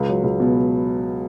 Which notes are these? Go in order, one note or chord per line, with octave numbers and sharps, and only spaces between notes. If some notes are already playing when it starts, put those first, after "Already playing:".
Already playing: C#2
F#3
C#2
B2